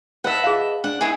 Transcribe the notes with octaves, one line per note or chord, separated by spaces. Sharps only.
B4 D#5 E5 F#5 A5
G#4 F5
D4 F#5
B3 D#4 E4 G#4